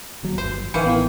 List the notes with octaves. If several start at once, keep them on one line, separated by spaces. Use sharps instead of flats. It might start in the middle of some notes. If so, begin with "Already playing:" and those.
D1 D#2 F#3
G1 C5
A1 D#3 E3 C5 F5 G#5 C#7
B3 E4